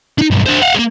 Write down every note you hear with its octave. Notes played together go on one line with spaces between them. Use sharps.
D4 D#4
B1 G2
D4 C5
F5 F#5
G#3 A#3